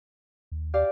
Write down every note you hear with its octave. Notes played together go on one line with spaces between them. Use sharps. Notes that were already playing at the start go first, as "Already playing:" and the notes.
D#2
G4 D5 F5